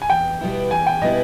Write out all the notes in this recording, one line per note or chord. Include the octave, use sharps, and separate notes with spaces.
G#5
E2 G5
B2 G3 B3 E4
E2 G#5
G5
B2 G3 B3 E4 D#5